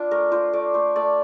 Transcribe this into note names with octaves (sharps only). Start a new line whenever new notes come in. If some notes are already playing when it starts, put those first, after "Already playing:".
Already playing: D4 F4
A3 A#4
F4 C5
A3 D5
A3 C5
A3 D5